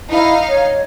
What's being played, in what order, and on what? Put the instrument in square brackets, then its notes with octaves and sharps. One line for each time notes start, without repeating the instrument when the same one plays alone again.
[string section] D#4 F5 [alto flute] E4
[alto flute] C#5